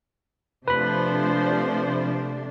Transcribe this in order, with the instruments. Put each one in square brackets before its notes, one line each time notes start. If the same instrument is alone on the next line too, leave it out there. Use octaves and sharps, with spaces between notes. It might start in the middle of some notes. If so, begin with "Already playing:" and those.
[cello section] C3 A3 D4 [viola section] F3 C5 [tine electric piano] B4 B5